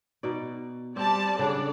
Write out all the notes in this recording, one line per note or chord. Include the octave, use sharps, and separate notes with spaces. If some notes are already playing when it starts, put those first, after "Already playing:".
B2 D#4 D5
G3 C4 D5 A5
C#3 D4 A4 D5 F#5